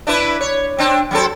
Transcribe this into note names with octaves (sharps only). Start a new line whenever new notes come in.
D4 E4 B4
C#5
C4 D4
F#3 C4 A4